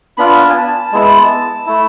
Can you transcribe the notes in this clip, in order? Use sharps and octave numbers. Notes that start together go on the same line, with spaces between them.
B3 D4 F4 B5
A5
G#5
A5
A5
G#3 B3 E4
A3 E4